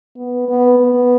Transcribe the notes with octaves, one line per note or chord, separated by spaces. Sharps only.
B3
B3
B3